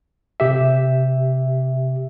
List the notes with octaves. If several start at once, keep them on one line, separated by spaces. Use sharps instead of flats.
C3 G4 E5